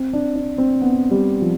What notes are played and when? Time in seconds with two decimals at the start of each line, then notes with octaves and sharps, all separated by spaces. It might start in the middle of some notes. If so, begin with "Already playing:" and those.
Already playing: C4
0.13 D4
0.36 D4
0.58 C4
0.82 B3
1.11 G3
1.42 F3